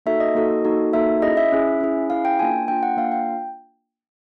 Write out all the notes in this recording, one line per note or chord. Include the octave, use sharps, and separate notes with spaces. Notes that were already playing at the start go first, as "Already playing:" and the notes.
A#3 D#4 F#4 A4 E5
D#5
A#3 D#4 F#4 A4
A#3 D#4 F#4 A4
A#3 D#4 F#4 A4 E5
C#4 E4 G#4 D#5
E5
C#4 E4 G#4
C#4 E4 G#4
C#4 E4 G#4 F5
G5
A#3 D4 F4 G#5
A#3 D4 F4 G5
F#5
A#3 D4 F4 F5
G5